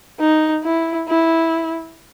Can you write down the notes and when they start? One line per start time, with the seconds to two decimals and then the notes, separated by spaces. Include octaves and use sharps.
0.20 D#4
0.64 E4
1.08 E4